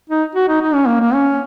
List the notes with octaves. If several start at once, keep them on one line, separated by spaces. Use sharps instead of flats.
D#4
F#4
D#4
D#4
C#4
A#3
A#3
C#4